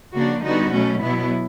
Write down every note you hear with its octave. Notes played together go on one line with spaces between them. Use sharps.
C#3 F3 A#3 D4 F#4
D3 G3 B3 D#4 F#4
B2 F#3 A3 C#4
B2 F#3 B3 E4